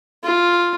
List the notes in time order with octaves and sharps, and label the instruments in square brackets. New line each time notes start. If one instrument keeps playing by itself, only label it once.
[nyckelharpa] F4